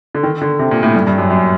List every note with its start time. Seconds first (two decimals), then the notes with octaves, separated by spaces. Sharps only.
0.15 D3
0.23 D#3
0.41 D3
0.59 C3
0.71 A#2
0.83 A2
0.95 G2
1.07 G2
1.18 F#2
1.30 F#2